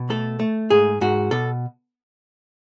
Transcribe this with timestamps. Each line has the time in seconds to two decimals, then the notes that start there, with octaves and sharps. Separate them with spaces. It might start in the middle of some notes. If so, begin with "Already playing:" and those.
Already playing: B2
0.10 A3 A4
0.39 A3
0.70 G#2 G#4
1.01 G#2 F#4
1.31 B2 A4